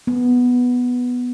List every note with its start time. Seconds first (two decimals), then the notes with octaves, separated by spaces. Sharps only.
0.07 B3